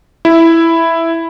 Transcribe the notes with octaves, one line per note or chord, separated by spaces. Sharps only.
E4